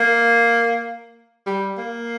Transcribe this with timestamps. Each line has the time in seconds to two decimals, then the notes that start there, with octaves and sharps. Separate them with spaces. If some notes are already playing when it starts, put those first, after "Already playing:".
Already playing: A#3
1.46 G3
1.77 A#3